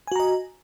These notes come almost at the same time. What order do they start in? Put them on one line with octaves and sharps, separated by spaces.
G#5 F#4 A#5 D#5